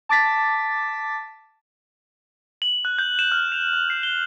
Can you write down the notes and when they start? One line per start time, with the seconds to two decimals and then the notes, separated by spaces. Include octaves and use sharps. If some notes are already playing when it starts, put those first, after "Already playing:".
0.09 A5 D6 A6 B6
2.62 F#7
2.85 F#6
2.99 G6
3.19 E7
3.32 F6
3.52 F7
3.73 F#6
3.90 C7
4.03 G7